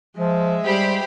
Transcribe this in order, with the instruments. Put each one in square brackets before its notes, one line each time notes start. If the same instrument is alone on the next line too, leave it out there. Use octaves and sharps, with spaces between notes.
[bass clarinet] F3 [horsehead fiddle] G#3 E5
[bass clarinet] G3 [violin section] G4 C5 B5